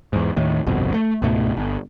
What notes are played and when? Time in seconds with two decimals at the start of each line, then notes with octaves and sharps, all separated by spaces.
0.13 E2 G#2
0.36 D#2 A2 D#3
0.66 G1 C2 F2 B2
0.94 A3
1.22 C#2 G#2 B2 A3
1.57 G1